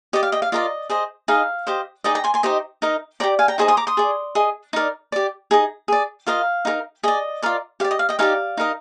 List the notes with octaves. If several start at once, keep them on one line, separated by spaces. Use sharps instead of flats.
G4 D5 D#5
F5
D#5 G5
F5
F4 A#4 D5 D#5
G#4 C5 D#5
D#4 G#4 D#5 F5
G4 C5 D#5
D#4 G#4 D5 D#5 G5
G5 A#5
G#5 C6
G#5 C6
D#4 G4 C5 D#5
D#4 A#4 D#5
G4 D5 G5 A#5
F5 G#5
G5 A#5
D#4 G#4 C5 D#5 G#5 C6
C6 D#6
A#5 D6
C6 D#6
G#4 D5
G#4 D#5
D#4 A#4 D5
G4 D5
D#4 G#4 D#5
G#4 D5
F4 A#4 D#5 F5
D#4 G4 A#4
G#4 D5 D#5
F4 A#4 D5
G4 D5 F5
D#5
F5
D#5 G5
D#4 G4 D5 F5 G#5
D#4 A#4 D#5